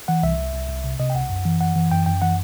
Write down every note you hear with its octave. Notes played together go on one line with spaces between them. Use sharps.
E3 F#5
C2 E5
C2
C2
C2
C3
C3 D#5
G5
C2 F#5
F#2
E3
F#2 F#5
E3
F#2 G5
F#2 G5
E3 F#5